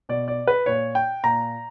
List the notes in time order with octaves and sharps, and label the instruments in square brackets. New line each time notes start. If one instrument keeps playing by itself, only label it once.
[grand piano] B2 D5
D5
B4
A#2 C#5
G5
A#2 A#5